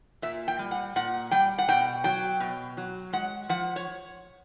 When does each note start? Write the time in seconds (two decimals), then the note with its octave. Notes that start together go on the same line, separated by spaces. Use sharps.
0.22 A#2 E5
0.48 G5
0.59 G3
0.71 F#5
0.96 A#2 F#5
1.31 G3 G5
1.58 F#5
1.68 B2 G5
2.04 F#3 G5
2.40 B2
2.77 F#3
3.13 G#3 F#5
3.49 F3 F#5
3.76 C#5